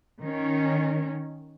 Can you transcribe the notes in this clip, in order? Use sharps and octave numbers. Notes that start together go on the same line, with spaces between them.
D#3 C#4